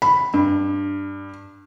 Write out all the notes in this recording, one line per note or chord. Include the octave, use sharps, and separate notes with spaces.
B5
G2